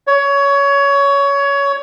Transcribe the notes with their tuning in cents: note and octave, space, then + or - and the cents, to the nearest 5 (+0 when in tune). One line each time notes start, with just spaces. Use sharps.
C#5 +20